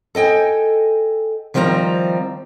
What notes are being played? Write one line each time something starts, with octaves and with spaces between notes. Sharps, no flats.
A4 D#5 G5 G#5
D#3 F3 G3 C4 F#5 A#5